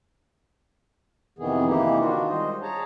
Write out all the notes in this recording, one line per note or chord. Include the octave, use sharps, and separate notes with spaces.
F2 C3 D#3 E3 B3 G#4
C3 E3 A#3 D#4 E4 G4
D#3 D4 F4 F#4
G3 G#3 C5 D#5
G#4 C#5 A5 A#5